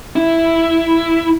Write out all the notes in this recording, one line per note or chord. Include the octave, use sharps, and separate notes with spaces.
E4